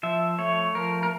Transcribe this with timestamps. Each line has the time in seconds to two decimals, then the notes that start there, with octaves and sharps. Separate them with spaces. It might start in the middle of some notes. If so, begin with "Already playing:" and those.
0.03 F3 E5
0.39 A3 C#5
0.75 F3 A#4
1.03 A#4